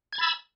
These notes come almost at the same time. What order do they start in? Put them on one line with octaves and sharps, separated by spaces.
G#6 A6 B5 E6